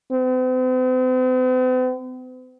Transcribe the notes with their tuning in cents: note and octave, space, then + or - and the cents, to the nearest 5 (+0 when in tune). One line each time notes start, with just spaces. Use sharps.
C4 -45